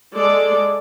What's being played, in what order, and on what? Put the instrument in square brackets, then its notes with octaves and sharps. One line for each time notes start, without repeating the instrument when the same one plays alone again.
[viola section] G#3 A4 D5